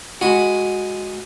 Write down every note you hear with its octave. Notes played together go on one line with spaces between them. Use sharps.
G#3 F#4 B5